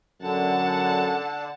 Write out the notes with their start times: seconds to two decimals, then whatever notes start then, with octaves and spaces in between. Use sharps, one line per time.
0.22 F#2 D3 F#5 A5